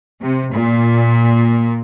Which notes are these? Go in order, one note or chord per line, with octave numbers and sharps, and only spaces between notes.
C3
A#2